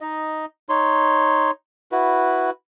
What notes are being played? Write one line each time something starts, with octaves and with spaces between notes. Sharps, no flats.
D#4 D#5
D#4 C#5 C6
E4 F#4 B4